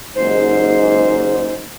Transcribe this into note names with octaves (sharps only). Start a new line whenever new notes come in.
F#1 D#2 G#2 C5